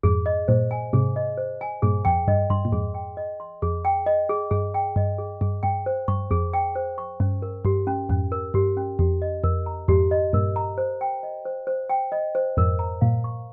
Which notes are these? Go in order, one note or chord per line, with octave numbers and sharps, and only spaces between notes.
F2 G#2 G#4
D#5
G2 A#2 C5
G#5
G#2 C3 G#4
D#5
C5
G#5
G2 A#2 G#4
F2 G5
G2 D#5
G2 C6
A#2
F2 G#2 G#4
G5
D#5
C6
F2 G#4
G5
D#5
G#4
G2 G#4
G5
G2 D#5
G#4
G2 G#4
G2 G5
C5
G2 C#6
F2 G#4
G5
C5
C#6
G2 C#4
A#4
G2 G4
C#4
F2 G#2 C#4
A#4
G2 G4
C#4
F2 G4
D#5
F2 A#4
A#5
F2 G#2 G4
D#5
G2 A#2 A#4
A#5
C5
G5
D#5
C5
C5
G5
D#5
C5
F2 G#2 A#4
A#5
G2 A#2 F5
C#6